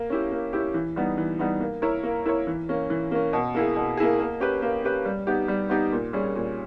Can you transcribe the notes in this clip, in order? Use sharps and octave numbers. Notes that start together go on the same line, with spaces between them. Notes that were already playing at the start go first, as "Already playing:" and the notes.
Already playing: A#3
C#4 E4 G4
A#3
C#4 E4 G4
E3
G3 B3 D#4
E3
G3 B3 D#4
A#3
E4 A#4 C#5
A#3
E4 A#4 C#5
E3
A#3 C#4
E3
A#3 C#4
B2
A#3 E4 G#4
B2
A#3 E4 G#4
A#3
C#4 G4 B4
A#3
C#4 G4 B4
G3
B3 D#4 G4
G3
B3 D#4 G4
A#2
G3 C#4 G#4
A#2